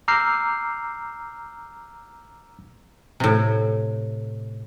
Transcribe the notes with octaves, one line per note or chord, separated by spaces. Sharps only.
A#5 D6 E6 F6 G6 C7
A2 C3